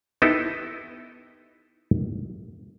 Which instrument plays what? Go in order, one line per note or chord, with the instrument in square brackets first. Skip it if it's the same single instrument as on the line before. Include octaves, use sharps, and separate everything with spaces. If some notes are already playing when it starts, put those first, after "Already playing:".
[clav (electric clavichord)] B3 D#4 E4 G4 A4